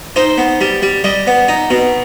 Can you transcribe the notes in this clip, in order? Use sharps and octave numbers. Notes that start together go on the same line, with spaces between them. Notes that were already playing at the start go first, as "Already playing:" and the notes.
D#4 C5
B3
G3
G3
G3 D#5
B3
D#4
B2